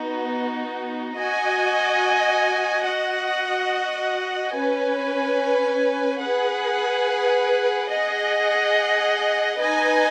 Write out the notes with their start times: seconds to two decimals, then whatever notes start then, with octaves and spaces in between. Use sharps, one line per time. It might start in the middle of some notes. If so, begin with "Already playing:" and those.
Already playing: B3 D#4 F#4
1.15 F#4 D#5 G#5
2.85 F#4 D#5 F#5
4.53 C#4 B4 G#5
6.22 G#4 B4 F#5
7.91 G#4 D#5 F#5
9.59 D#4 B4 D#5 G#5